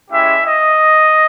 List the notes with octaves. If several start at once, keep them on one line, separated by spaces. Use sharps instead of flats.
G#3 C#4 E4 G4 E5
D#5